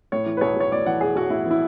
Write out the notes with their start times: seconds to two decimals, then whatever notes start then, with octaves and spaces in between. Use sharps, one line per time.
0.12 A2 C#5
0.26 E3
0.37 B4
0.41 B1 C#5
0.57 B1 C#5
0.72 A2 D5
0.86 E3 F#5
1.01 B1 G#4
1.15 B1 F#4
1.30 A2 E4
1.46 E3
1.51 E4